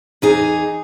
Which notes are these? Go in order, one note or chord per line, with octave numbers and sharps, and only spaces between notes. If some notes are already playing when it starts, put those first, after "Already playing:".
E2 D#4 G#4